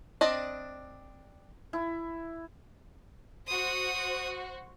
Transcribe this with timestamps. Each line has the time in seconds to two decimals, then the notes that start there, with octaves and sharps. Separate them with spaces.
0.21 C4 D4 D5 D#5
1.73 E4
3.47 F#4 C5 D#6